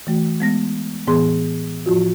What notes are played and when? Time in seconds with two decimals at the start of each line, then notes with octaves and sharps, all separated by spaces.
0.07 E3 A3 F#4
0.40 G#3 B3 A#6
1.07 A2 E3 B3 G#4 C6
1.86 A2 F3 F4 F#4